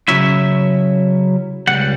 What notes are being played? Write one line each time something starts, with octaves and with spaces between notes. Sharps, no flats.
C#3 F#3 C#4 E4 E5
C#2 B2 G3 F#5